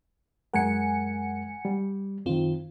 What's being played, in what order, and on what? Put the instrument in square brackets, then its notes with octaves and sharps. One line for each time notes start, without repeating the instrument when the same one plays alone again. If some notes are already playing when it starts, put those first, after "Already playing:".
[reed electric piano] F#2 G#3 A#4 [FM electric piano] F#5 G#5 C#7
[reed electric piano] G3
[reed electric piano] F#2 D#3 [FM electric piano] C4 F4